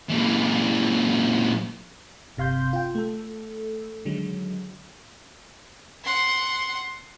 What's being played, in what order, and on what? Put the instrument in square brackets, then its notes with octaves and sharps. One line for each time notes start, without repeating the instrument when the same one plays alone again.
[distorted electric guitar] A#2 E3
[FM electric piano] G1 C3 F5 C6 G6
F4 G5
A3 A4
D3 D#3 F#3 G#3
[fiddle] F#5 C6